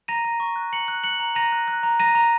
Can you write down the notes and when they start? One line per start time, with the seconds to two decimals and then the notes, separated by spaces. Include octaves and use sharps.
0.08 A#5 A#6 D#7
0.25 A#5
0.40 C#6
0.56 F#6
0.72 A#5 C#7 F#7
0.88 F#6
1.04 F#6 C#7 F#7
1.20 A#5
1.35 A#5 A#6 D#7
1.52 F#6
1.68 F#6
1.83 A#5
2.00 A#5 A#6 D#7
2.15 A#5